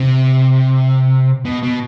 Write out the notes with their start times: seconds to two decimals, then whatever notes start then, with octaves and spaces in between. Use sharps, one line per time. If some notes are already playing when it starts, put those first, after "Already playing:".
Already playing: C3
1.45 B2
1.63 B2